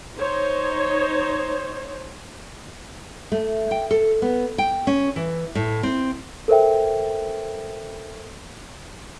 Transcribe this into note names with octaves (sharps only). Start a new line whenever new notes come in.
D#4 C5 C#5
A3
G5
A4
B3
G5
C#4
E3
A2
C4
A4 A#4 C5 E5 G5